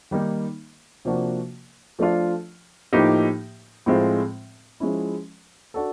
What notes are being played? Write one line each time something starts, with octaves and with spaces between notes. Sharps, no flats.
D#3 G3 A#3 D#4
C3 F3 A#3 D4 F#4
F3 A3 D4 F4
A2 F3 A#3 D#4 G4
A2 F3 G#3 C4 F4
F3 G#3 C#4 E4
D4 F#4 A4